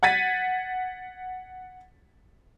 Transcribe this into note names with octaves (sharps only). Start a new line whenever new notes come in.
F#5 G#6 A6 B6 D#7